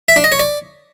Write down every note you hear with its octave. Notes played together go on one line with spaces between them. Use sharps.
E5
D4
D#5
C#5
D5